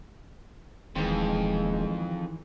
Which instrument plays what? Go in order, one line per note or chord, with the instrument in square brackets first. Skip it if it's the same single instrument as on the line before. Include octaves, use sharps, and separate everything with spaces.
[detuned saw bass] D#1 [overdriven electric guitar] F2 [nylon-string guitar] D#3 E3 [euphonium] G#3